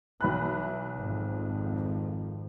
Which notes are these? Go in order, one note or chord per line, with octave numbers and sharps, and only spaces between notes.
B1 E3 B5 F#6
G#1 F2